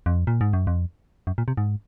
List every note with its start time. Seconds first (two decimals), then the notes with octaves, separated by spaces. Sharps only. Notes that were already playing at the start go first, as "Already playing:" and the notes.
0.06 F2
0.27 A#2
0.41 G#2
0.53 F#2
0.67 F2
1.27 F#2
1.38 A#2
1.48 C3
1.57 G#2